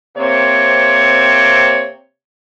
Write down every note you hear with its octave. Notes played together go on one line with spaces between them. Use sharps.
C3 A#3 C4 C#5